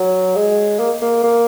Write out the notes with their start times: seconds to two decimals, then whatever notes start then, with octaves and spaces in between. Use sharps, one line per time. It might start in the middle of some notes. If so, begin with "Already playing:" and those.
Already playing: F#3
0.36 G#3
0.79 A#3
1.02 A#3
1.24 A#3